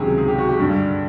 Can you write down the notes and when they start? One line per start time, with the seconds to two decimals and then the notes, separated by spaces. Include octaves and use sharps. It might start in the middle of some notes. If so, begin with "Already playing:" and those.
Already playing: C#2 C3 D#3 F#3 G4 G#4
0.18 G#4
0.28 G4
0.38 F#4
0.49 G4
0.60 G2 D3 G3